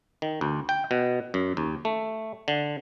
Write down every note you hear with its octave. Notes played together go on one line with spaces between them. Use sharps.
D#3
D2
G5
B2
F#2
D#2
A3
D3